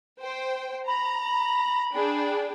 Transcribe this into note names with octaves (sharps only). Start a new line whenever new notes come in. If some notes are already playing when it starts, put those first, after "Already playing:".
C5 G5
A#5 B5
D4 G#4 G5